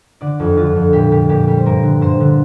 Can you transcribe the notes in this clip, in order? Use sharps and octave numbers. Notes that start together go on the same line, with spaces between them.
D3 D5
F2
D3 F4
F2
A#2 G4
A#2 G4
A#2 G4
G3 G4
C5
G2 A#4
D3
G2 C5
D3